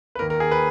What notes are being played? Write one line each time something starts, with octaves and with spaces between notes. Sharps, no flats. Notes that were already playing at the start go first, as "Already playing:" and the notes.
B4
D#2 D#3 A#3 A#4
A#4
G#4
B4